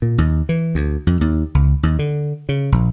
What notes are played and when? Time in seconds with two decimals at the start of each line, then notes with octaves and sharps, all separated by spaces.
0.02 A#2
0.18 D#2
0.49 E3
0.75 D2
1.07 F2
1.21 D#2
1.55 C#2
1.83 D#2
1.99 D3
2.49 C#3
2.72 A#1